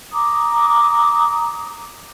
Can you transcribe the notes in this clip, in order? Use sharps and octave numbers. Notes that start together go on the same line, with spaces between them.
A#5 D6 D#6